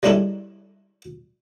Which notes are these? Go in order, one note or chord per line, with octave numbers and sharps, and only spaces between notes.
G3 G#3 C#4 D4 E4 A4